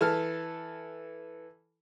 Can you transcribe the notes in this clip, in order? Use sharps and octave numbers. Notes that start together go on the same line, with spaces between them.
E3 A4 F6